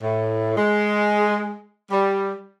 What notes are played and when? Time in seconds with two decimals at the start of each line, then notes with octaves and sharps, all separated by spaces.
0.02 A2
0.57 G#3
1.91 G3